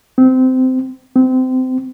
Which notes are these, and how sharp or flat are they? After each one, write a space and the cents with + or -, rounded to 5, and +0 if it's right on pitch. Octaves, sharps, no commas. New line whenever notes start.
C4 -20
C4 -25